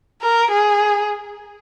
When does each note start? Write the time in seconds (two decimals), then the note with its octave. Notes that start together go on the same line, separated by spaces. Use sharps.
0.22 A#4
0.51 G#4